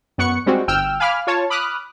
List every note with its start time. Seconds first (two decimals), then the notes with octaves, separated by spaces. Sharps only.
0.18 F#2 B3 F#5 C#6 C#7
0.46 G3 G#3 C4 F#4
0.68 G1 G5 E6 F6
1.00 F5 G#5 B5 D6 F6
1.27 F4 C#5 A5
1.50 B5 D6 D#6 F6 F#6